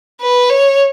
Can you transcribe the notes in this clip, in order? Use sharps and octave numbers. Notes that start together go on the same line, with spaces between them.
B4
C#5